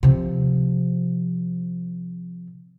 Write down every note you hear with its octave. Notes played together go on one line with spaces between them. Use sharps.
C3 F3